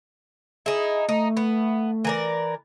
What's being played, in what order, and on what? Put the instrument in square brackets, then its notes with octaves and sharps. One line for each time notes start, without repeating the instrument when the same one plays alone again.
[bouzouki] D#4 E4 [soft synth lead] G#4
[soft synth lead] A3 [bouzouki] D#4
[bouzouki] B3
E3 A#4 D5